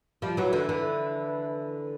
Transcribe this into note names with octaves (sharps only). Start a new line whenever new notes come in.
F3 G3
E3 F#3
D3 E3
D3 E3